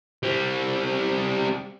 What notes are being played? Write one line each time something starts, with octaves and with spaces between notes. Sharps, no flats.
G3 C4